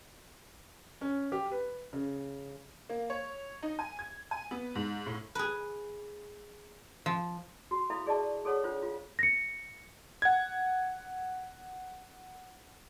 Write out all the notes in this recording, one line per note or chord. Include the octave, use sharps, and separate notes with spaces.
C#4
G4
B4
C#3
A#3
C#5
D#4
G#5
G#6
G#5
B3
G#2
A2
G#4 B4
F3
F#4
E4 A4 E5 F5 B5
G#4 D5 D#5 A5 C#6
G#4 A4 C#5 F#5
D4 F4 C5
F4 F5
A#6 C#7
F#5 G#6